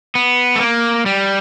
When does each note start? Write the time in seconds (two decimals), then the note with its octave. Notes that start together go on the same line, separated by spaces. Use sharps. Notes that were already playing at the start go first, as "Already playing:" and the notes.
0.15 B3
0.56 A3
0.60 A#3
1.06 G3